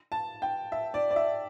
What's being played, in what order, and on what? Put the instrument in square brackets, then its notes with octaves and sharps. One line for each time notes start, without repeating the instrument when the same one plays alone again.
[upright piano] A5
G5
E5
D5
D5
E5